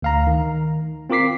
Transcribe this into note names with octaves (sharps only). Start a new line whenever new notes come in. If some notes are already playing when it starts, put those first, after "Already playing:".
D2 F5 A#5
D#3
C4 F4 A#4 D6 B6 C7